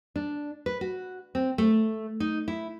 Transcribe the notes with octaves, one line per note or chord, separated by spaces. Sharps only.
D4
B4
F#4
C4
A3
D#4
E4